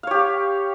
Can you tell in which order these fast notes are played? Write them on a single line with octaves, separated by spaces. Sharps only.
F5 C#5 G4